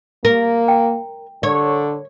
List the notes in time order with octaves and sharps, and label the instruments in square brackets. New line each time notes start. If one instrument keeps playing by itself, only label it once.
[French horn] A#3 [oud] A#4
[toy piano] G5
[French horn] D3 [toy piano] A#4 [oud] C#5